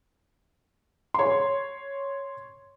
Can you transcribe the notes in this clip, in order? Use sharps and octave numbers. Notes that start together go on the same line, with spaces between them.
C#5 C6